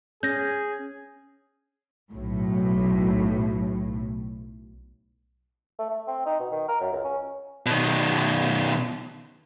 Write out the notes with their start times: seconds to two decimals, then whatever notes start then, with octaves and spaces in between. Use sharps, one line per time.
0.23 C#4 G#4 G6 A#6
2.13 B1 A2
5.79 A3
5.90 A3
6.07 C4
6.26 D#4
6.40 B2
6.51 D#3
6.68 A#4
6.81 F#2
6.92 C#2
7.04 C#4
7.66 B2 D#3